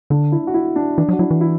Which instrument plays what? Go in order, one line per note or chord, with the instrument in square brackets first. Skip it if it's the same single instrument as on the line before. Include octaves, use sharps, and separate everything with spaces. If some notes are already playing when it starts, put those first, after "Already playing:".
[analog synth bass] D3 [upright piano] D4
[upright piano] E4
F#4
E4
D4
[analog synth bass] E3 [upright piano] D4
[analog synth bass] F#3
[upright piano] F#4
[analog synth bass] F#3 [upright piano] E4
[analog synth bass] E3
[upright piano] E4